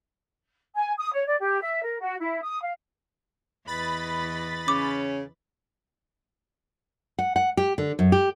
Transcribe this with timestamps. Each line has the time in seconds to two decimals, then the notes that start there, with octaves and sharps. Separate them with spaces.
0.75 G#5
0.98 D#6
1.13 C#5
1.27 D5
1.40 G4
1.61 E5
1.83 A#4
2.01 F#4
2.19 E4
2.43 D#6
2.62 F5
3.67 E2 B4 D#5 B5 A6
4.68 C#3 C#4 D6
7.19 F#5
7.36 F#5
7.57 G4
7.78 D3
7.99 F#2
8.12 G4